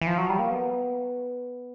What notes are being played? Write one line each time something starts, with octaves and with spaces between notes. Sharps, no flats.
E3
F3
F#3
G3
A#3
B3